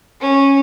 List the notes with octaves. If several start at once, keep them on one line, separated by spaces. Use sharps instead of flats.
C#4